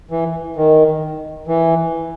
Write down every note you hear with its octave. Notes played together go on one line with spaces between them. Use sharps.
E3
D#3
E3